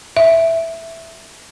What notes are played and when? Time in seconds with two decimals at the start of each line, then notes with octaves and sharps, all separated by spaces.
0.17 E5